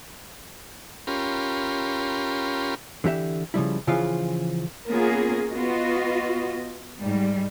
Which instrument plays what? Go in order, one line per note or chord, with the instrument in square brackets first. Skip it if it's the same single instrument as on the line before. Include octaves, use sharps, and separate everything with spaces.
[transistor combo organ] C#4 F4 G4 A#4 B5 C6
[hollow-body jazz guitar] D3 E3 G4 E5
C#3 F3 G3 E4
C#3 E3 F3 C#4 F4 F5
[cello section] A#3 B3 C#4 F4 G#4 A#4
B3 F4 F#4 D#5
G#2 G3